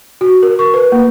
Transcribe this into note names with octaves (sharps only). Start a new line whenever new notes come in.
F#4
A#4
C#6
B4
A#3